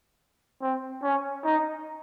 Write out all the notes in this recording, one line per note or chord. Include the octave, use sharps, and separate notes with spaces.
C4
C#4
D#4